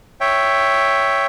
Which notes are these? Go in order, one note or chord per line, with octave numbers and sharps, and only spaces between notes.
C#5 E5 G5